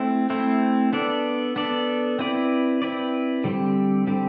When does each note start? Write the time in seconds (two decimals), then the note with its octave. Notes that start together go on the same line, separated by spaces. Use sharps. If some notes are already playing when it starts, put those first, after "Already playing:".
Already playing: A3 C4 E4
0.30 A3 C4 E4
0.93 B3 D4 A4 D5
1.56 B3 D4 A4 D5
2.19 C4 E4 B4 D5
2.82 C4 E4 B4 D5
3.44 D3 G3 C4 G4
4.07 D3 G3 C4 G4